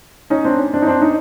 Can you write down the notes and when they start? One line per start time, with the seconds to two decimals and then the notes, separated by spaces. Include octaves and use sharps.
0.30 C#4 D#4
0.45 C4 D4
0.59 C#4
0.74 C4 D4
0.82 D#4
0.87 C4 D4
1.01 C#4 D#4